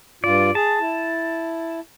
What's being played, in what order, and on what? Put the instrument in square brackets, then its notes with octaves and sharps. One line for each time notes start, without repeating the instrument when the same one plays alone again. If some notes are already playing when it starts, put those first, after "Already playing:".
[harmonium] G2 F4 [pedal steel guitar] D5
[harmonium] G#4 [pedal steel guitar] A5
[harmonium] E4